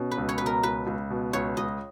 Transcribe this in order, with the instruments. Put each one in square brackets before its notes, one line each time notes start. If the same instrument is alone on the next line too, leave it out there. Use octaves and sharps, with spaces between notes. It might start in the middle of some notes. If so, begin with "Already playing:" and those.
Already playing: [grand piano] B2 [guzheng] C#4
[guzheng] B4
[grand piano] C#2
[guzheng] C#5
[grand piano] B2 [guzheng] B4
[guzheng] A#4
[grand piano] C#2 [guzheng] B4
[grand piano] C#2
B2
[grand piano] C#2 [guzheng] C#5
[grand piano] C#2 [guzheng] D#5